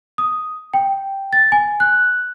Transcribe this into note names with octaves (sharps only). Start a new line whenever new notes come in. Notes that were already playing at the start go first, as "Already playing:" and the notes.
D#6
G5
A6
G#5
F#6